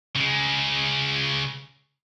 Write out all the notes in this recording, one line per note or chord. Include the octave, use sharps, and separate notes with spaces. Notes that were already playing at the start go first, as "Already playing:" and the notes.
C#3 G#3